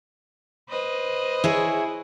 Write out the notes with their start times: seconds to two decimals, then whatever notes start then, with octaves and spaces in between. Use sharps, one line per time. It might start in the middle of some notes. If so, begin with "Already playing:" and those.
0.69 B4 C5 D#5
1.44 E4 G#4 C#5